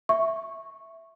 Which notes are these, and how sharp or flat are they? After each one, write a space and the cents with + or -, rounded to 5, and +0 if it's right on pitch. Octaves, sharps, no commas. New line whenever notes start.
E5 +0 C#6 -10